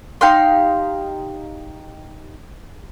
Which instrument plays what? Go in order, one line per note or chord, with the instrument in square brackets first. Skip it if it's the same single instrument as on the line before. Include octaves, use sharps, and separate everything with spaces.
[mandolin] D#4 G4 F5 C6